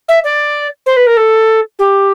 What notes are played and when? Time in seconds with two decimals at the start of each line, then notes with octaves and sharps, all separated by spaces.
0.08 E5
0.24 D5
0.86 C5
0.96 B4
1.07 A#4
1.17 A4
1.79 G4